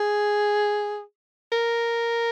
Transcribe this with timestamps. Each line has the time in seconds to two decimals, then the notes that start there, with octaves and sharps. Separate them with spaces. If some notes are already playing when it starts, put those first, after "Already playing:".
Already playing: G#4
1.52 A#4